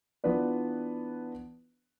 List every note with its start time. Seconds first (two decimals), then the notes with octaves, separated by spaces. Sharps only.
0.24 E3 B3 D4 F4 B4 D5